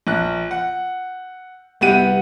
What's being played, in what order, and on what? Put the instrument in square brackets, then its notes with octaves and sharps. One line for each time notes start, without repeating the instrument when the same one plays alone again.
[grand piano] A#1 F#6
F#5
[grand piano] C2 F#5 D#7 [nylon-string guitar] B3 G4 E5